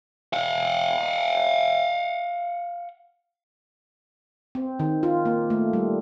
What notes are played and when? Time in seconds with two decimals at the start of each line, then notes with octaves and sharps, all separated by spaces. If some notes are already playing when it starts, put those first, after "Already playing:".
0.33 F5 F#5
4.55 C4
4.79 D#3
5.03 F4
5.25 A#3
5.50 A3
5.73 G3